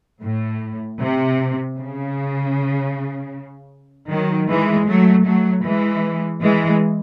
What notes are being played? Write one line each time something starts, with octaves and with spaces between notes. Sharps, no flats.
A2
C3
C#3
D#3 F#3
E3 G#3
F#3 A3
F#3 A3
E3 G#3
E3 G#3